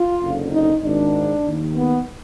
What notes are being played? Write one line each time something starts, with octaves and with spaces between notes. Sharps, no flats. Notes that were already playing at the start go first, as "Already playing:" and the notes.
Already playing: F4
F#1 F2 D3
D#4
G#1 G#2 D#3 D4
D#2 D#3
B3